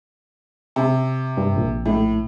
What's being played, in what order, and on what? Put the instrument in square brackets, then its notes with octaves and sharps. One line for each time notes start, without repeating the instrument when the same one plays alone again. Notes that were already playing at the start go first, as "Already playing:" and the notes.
[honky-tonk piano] C3
[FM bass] G2
A#1
[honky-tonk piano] A2